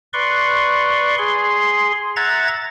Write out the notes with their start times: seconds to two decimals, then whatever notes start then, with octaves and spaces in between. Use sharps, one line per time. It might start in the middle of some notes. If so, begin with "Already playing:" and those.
0.13 B4 D5 C6 C#6
1.18 G#4 C6
2.16 E5 F#5 A#5 G#6 A6